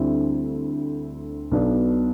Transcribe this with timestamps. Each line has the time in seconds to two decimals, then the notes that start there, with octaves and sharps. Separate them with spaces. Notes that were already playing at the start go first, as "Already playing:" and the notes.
Already playing: D2 D3 G3 C4 E4
1.51 B1 B2 F#3 B3 D4